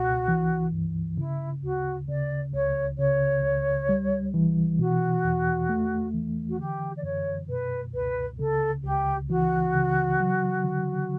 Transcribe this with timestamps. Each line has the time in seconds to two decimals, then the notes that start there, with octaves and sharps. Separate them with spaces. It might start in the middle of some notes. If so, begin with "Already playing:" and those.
Already playing: C#2 B2 F#4
0.28 E3
0.72 G2
1.17 C#3 E4
1.63 D2 F#4
2.08 C#3 D5
2.53 C#2 C#5
2.98 C#3 C#5
3.43 C#2
3.89 G3
4.34 E3
4.79 B2 F#4
5.24 E2
5.69 A3
6.14 E3
6.48 F#4
6.59 D3 G4
6.96 D5
7.03 F#2 C#5
7.49 B2 B4
7.94 C#2 B4
8.39 C#3 A4
8.84 C#2 G4
9.29 E3 F#4
9.74 C#3
10.20 F#3
10.64 D3